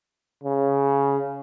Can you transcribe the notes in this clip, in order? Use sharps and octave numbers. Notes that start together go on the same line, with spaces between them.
C#3